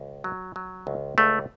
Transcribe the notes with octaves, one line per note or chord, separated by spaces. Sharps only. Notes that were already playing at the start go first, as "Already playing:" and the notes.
Already playing: C#2
F#3
F#3
C#2
C#2 A3